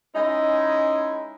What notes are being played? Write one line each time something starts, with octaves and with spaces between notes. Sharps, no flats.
G#3 C#4 D#4 E4